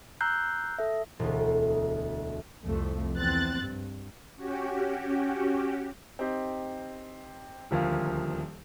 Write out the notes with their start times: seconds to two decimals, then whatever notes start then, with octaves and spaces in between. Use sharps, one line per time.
0.21 A#5 E6 F#6 G6 C7
0.78 A4 E5
1.19 E1 D2
2.64 C2 F2 A3
3.16 E2 C4 F#6 A6
3.62 G2
4.36 C#4 F#4 G4
6.19 C4 D#4 G4
7.71 D#1 D2 F3 A#3 F5